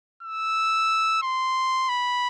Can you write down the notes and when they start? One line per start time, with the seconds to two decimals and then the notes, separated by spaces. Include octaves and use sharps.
0.23 E6
1.22 C6
1.89 B5